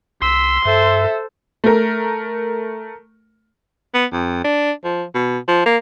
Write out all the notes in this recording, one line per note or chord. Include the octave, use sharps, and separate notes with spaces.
C2 C6 E6 B6
G2 A4 C5 E5
A3 A#4
B3
F2
D4
F3
B2
F3
A#3